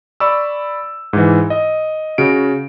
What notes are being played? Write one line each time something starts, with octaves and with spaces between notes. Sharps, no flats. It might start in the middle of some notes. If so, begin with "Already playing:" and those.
D5 B5 C#6 E6
G#2 E3
D#5
C#3 F#4 D7